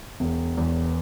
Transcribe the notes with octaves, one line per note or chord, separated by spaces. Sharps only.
E1
E2